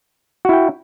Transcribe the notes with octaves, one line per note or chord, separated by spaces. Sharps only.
E4 F#4 G5